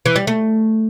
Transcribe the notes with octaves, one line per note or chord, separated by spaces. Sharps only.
E3
G3
A3